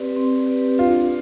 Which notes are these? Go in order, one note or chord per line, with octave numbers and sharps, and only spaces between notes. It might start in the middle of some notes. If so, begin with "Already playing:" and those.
Already playing: C4 G4 B4 D5
C4
G4 B4 D5
D4 F4